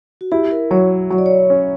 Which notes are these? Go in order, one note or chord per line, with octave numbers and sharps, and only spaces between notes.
F#4
E4 G4
A#4
F#3 C#5
F#3 C#5
D5
C#5
C#4